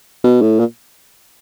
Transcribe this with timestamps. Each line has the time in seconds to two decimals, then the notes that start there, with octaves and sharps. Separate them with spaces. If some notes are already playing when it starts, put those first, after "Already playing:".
0.24 B2
0.42 A2
0.60 A#2